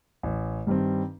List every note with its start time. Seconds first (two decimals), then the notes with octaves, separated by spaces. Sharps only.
0.23 A1
0.67 G2 D#3 G3 C4